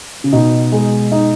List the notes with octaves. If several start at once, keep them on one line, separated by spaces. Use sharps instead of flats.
C#3
B2 D#4
G#3
D#4